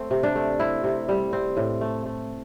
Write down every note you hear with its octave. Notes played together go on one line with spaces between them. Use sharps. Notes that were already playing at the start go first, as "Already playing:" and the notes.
Already playing: A3 C4
C3
D4
A3
C4 E4
C3
G3
C4
A2
A3
A3